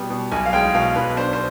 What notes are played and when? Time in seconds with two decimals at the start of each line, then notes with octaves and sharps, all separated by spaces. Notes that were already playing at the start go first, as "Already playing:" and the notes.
Already playing: B2 G3 B3
0.10 B2
0.31 B1 G#5
0.46 F5
0.53 G#3 G5
0.74 B2 F5
0.96 B1 B4
1.17 D4 C5
1.33 C5